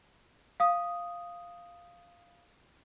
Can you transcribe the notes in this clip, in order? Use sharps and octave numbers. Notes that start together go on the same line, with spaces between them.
F5 D#6